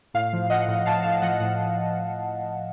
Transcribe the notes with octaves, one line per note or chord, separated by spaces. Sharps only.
A2 F5
F3
F3 D#5 F#5
A2
A2 F5 A5
A2 F5 A5
F3 D#5 F#5
A2 F#5